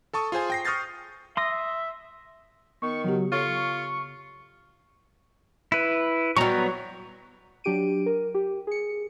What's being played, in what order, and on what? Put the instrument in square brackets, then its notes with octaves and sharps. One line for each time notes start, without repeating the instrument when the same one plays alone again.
[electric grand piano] A4 A5 C#6 D#6
F4 G#4 C5 G#5
G5 A#6 C7
C#6 D#6 F6 G6 A6 C7
[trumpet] E5 [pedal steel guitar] C6 D#6 [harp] A#6
[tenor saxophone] D#3 [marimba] B3 [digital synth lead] C#6
[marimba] C#3 B3 G4 [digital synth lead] F#3
[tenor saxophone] F4 [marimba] A4 C#5 F5 [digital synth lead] C#6
[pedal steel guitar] E4 B4
[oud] F#3 G3 [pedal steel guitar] B3 A#5 C#6
[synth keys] F#3 D4 G4 D7 D#7
A#4
G4
G#4 C#7